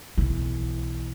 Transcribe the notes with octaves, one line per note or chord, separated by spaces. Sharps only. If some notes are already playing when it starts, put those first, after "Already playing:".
B1 E3